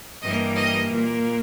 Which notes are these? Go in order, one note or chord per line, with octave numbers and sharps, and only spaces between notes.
G2 E3 G3 A#3 D#5
D#5
A#2 A#3